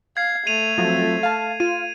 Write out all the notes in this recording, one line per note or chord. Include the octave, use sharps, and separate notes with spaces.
F5 G#6 C7
A3 D#7 F7
F3 F#3 C4
F5 A5
F4 D#7